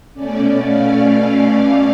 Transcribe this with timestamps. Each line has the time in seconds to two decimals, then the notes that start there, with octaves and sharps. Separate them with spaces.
0.14 B2 A3 C#4 D5
0.64 F5
1.15 F5